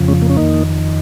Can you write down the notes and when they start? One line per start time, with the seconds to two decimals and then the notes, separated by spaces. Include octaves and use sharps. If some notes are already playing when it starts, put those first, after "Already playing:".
Already playing: F2 C#3 F3
0.08 G#3 C#4
0.22 A#3
0.30 C#4
0.37 F2 D#3 A#3 D#4